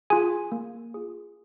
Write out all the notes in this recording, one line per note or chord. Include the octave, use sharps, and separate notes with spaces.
F4 G#4 G#5
A#3
F4 G#4